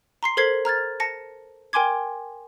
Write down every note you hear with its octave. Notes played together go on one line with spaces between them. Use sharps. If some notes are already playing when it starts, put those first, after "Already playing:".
A#5 C6 C7
A4 A#4 C5 G#6 B6 C7
A#5 F6 G#6 A6
A5 A#6 C#7
A#4 G5 G#5 C6 D6 G#6